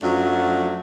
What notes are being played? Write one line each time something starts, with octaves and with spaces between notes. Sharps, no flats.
F#2 F3 F#3 A3 D4 F#5